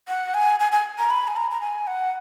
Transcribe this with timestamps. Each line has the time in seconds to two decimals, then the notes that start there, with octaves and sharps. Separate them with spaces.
0.09 F#5
0.34 G#5
0.60 G#5
0.72 G#5
0.98 A#5
1.10 B5
1.28 G#5
1.36 A#5
1.51 A#5
1.61 G#5
1.87 F#5